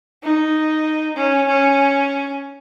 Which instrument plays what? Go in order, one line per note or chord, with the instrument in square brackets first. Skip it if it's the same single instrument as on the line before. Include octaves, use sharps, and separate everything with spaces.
[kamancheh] D#4
C#4
C#4